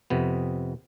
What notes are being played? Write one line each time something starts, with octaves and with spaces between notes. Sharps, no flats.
F2 C3 B3